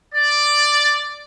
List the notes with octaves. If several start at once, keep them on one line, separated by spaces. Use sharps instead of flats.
D5